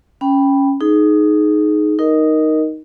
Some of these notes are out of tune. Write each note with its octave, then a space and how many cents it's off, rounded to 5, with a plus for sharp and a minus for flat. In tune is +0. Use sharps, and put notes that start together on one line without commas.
C#4 +0 G5 +5 B5 +0
D#4 -5 G#4 +25
D#4 +0 A#4 +5 D#5 +0